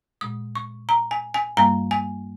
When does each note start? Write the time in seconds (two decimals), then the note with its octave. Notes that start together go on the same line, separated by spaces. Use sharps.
0.21 A#2 G#3 D#6
0.55 C#6
0.89 A#5
1.11 G#5
1.34 G#5
1.57 G2 G3 A#3 A#5
1.91 G#5